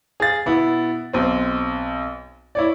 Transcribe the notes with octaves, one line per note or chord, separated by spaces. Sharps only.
G#4 F5 A6
B2 B3 E4
B1 C4
E4 C#5 D5